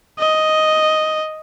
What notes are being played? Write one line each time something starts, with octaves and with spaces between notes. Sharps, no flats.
D#5